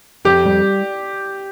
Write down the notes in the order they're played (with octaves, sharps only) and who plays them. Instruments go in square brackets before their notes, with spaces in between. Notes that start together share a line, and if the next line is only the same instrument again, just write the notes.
[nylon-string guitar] F2 [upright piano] G4
[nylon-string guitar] G3